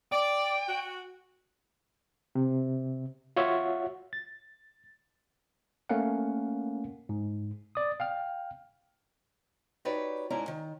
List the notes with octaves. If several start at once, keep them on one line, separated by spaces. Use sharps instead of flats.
D5 G5
F#4
C3
F4 F#4 C#5 E5 F#5
A6
A3 A#3 C#4 A#4 F5 F#5
G#2
D5 D#6
F5 G5 F6
D#4 F#4 G4 B4 C#5 D5
G#2 C#4 D4 E4 A#4 A#5
D#3